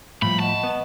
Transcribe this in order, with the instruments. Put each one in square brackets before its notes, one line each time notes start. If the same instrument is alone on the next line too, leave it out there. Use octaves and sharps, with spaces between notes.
[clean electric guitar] A2 F3 [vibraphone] G3 [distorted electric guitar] B5
[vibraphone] D#5 F#5 C#6 [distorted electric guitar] A5
[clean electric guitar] B3